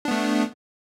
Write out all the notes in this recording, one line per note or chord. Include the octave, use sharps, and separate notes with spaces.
A3 B3 D4